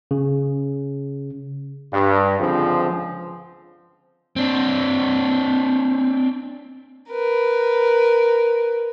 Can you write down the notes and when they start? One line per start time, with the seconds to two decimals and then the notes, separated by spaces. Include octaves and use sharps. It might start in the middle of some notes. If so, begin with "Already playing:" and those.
0.11 C#3
1.93 G2
2.39 C#2 D3 F3 C4 G#4
4.36 C4 D4
7.10 A#4 B4